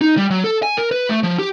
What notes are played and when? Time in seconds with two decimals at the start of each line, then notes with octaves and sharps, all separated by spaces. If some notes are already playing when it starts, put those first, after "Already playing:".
0.01 D#4
0.17 G3
0.30 F#3
0.44 A4
0.63 G#5
0.78 A#4
0.91 B4
1.09 A3
1.23 F3
1.39 G4